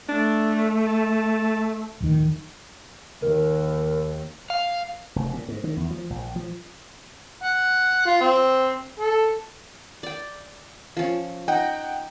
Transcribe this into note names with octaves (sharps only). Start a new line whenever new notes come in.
A3 D4
A5
D1 F2 D#3
D#2 A#4
F5
F1
A#2
G#2
D#3
E2
F3
A#1
F3
F#5
F4
C4
A4
D5 G5
F3 C#4
D#4 F#5 G5